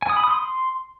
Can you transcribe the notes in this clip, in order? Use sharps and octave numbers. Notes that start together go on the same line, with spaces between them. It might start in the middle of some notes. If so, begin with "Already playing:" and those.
G#5
D#6
B5
D#6
C6